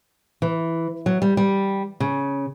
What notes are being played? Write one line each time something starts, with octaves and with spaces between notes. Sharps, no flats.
E3
F#3
G3
G3
C#3